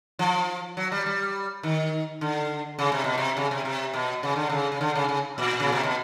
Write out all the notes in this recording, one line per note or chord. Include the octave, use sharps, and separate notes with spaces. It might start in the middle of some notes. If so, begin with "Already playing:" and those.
F3
F#3
G3
G3
D#3
D3
C#3
C3
B2
C3
C#3
C3
C3
B2
C#3
D3
C#3
C#3
D3
C#3
C#3
A#2
C#3
C3
B2